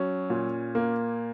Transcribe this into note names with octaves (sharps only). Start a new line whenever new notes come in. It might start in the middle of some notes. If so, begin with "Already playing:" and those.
Already playing: F#3 C#4
A#2
A#3